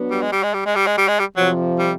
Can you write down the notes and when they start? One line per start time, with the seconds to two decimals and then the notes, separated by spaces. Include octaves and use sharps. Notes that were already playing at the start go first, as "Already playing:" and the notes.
Already playing: F#3 B3 D4 F#4
0.10 G3
0.21 G#3
0.32 G3
0.43 G#3
0.54 G3
0.65 G#3
0.75 G3
0.87 G#3
0.97 G3
1.08 G#3
1.19 G3
1.37 F2 C3 F3 F#3
1.79 G3